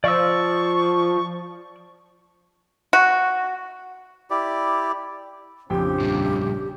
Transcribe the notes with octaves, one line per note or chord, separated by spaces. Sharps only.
F3 D5 C#6 E6
F#4
E4 G4 D5
A#1 F2 C#3 D4 G4 G5
G2 A#2